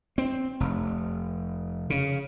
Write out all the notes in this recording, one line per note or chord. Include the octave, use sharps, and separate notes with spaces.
C4
F1
C#3